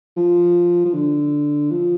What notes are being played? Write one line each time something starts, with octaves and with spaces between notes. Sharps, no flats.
F3
F3
D3
F3